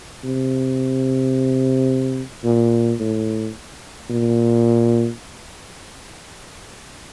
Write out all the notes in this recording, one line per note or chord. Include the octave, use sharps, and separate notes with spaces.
C3
A#2
A2
A#2